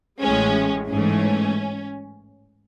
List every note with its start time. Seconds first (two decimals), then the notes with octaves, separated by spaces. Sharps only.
0.22 A1 A2 G#3 C#4
0.90 G#2 E3 A3 C#4